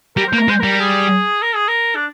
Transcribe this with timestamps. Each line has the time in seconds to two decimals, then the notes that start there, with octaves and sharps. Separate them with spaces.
0.16 G3 A#4
0.28 A#3 C5
0.38 A#4
0.48 G#3 C5
0.60 G3 A#4
0.80 G#4
1.42 A#4
1.55 G#4
1.68 A#4
1.96 D4